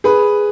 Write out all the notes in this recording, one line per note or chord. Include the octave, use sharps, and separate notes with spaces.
G#4 B4